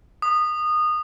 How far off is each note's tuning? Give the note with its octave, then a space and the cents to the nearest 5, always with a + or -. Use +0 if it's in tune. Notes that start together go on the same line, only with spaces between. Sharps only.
D#6 -20